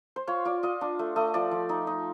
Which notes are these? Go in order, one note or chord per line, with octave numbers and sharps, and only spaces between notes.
C5
F4 C#5
F4 D5
F4 D#5
D4
A3
A3 D#5
F3 D5
F3
D#4
D#4